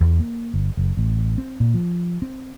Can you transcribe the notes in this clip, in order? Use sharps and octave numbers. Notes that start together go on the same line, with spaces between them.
E2
A#3
G1
F#1
A1
C4
A#2
F3
C4